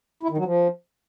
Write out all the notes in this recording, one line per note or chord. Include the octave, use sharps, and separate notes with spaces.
E4
D#3
F#3
F3